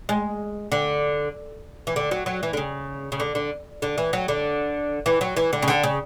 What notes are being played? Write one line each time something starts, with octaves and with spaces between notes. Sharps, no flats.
G#3
D3
E3
D3
F#3
F#3
E3
D3
C#3
C#3
D3
D3
D3
E3
F#3
D3
E3
F#3
E3
D3
C#3
D3
C#3